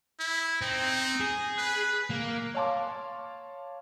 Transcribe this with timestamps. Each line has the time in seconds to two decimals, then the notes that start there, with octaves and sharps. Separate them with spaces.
0.20 E4
0.61 C4 D#4
1.20 G#4
1.58 B4
2.10 A#3
2.54 C#5 F5 A5 C6 D6